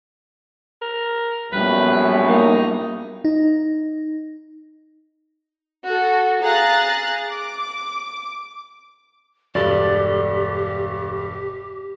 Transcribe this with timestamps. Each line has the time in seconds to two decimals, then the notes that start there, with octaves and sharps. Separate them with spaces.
0.82 A#4
1.53 A#1 F#2 A2 G3 B3 B4
2.28 A#3 D#4
3.25 D#4
5.85 F#4 A4
6.43 G#4 F5 A#5 F#6 A6
7.30 D6
9.55 E1 G2 G4 A4 D5